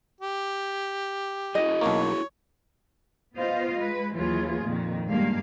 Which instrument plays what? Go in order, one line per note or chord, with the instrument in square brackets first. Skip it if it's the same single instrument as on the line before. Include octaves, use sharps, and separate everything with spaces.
[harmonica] G4
[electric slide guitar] E4 F#4 G#4 [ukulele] D#5
[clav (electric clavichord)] B1 A#3 [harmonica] C#5
[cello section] B3 F4 C5 D#5 F5
G#3 B4
D#2 E3 F#3 F4 G#4
F2 A#2 D#3
G2 G3 G#3 A#3 F5